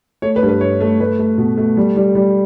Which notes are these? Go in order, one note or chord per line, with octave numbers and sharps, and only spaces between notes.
A3 C#5
B4
G2
B4
G2 C#5
A3
A3 B4
A3
B2
A3
G3
G3
G3